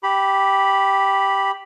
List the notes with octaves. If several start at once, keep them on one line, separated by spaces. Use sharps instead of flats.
G4 B5